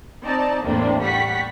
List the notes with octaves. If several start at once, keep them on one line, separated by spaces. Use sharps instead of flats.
C4 D#4 D5 A5 A#5
E2 A2 C3 A3 A#3 D4
G3 F#5 C#6 B6